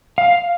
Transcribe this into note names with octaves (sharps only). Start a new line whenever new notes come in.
F5